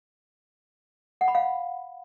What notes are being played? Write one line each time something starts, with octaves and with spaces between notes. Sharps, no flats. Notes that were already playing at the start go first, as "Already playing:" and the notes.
F#5
B5
F5